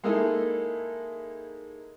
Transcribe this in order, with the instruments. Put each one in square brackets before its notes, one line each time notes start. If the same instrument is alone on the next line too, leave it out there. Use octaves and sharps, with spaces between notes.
[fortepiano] G#3 A#3 D#4 E4 A4